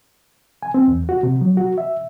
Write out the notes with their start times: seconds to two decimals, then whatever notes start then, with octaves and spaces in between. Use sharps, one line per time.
0.63 G#5
0.74 C4
0.88 E2
1.09 F#4
1.23 C3
1.41 F#3
1.57 F#4
1.78 E5